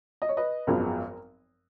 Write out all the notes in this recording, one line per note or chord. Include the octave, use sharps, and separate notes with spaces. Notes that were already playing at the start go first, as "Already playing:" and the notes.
D#5
C#5
B4 D#5
G#1 F#2 F3 G#3 B3 A#4